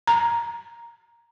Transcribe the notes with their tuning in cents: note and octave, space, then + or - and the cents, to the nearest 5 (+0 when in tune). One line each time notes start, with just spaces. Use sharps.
A#5 +5